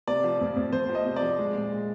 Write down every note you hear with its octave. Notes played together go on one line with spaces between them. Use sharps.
C3 D5
F3
F2
F2
F2 C5
F3
D#5
C3
D5
F3
G#3
A#2
G#3